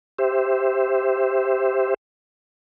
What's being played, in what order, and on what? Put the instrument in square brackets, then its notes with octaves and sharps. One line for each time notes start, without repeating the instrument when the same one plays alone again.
[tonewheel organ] G4 C5 E5